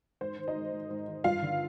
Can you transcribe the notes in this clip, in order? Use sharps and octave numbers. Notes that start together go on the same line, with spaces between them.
G#2 C5
D#3
D#4 D#5
G#3
G#2
G#2
D#3
G2 F4 F5
D3